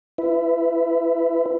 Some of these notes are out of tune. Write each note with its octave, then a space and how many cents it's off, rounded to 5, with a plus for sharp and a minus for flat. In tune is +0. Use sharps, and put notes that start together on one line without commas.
E4 +40 B4 +20 E5 +5